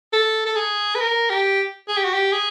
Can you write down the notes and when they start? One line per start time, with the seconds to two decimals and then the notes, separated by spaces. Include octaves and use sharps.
0.13 A4
0.46 A4
0.56 G#4
0.95 B4
1.00 A#4
1.30 G4
1.88 G#4
1.97 G4
2.04 F#4
2.14 G4
2.33 G#4